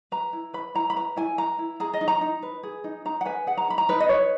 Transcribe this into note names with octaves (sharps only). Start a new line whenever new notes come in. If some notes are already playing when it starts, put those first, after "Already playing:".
B4 A#5
E4
B4 B5
E4 A#5
B5
B4 A#5
E4 G#5
B4 A#5
E4
G#4 A#5
D#5
D#4
A#5
D#4
B4
G#4
D#4
D#4 A#5
F#5
B4 G#5
G#4 F#5
A#5
D#4 B5
A#5
D#4 B4
D#5
B4 C#5